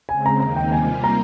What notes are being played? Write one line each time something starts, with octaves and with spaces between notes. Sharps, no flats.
C#3 G#3 C4 G#5
A#5
D#2 D#3 A#3 D#4 A#5
G5
C3 G3 A#3 F4 G#5
A#5